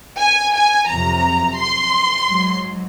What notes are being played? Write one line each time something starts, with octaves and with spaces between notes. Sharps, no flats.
G#5
G#5
F2 C3 F#3 A#5
C6
G#2 F#3